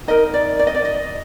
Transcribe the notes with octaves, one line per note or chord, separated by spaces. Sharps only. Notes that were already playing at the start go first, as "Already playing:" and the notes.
D#4 A#4 D#5
D5
D5
D#5
D5
D#5